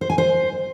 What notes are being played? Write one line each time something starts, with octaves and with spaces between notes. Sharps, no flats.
C5
G#5
C5